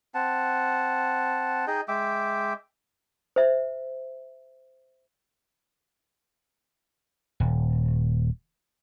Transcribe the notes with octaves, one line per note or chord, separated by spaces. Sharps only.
C4 F#5 A5
D#4 G#4 D#5 G5
G#3 E5 G5 D6
C5 E5
D#1